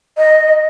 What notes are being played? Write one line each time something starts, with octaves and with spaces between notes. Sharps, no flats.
D#5